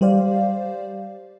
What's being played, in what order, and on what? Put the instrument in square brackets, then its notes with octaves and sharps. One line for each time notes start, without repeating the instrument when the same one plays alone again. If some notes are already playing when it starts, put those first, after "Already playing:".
[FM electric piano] G3 G4 C5 D5 F5